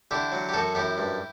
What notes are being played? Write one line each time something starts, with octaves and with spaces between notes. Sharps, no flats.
D3 E4 G4
F#3
G4
F#2 F#4 A4
F#2 E4 G4
G2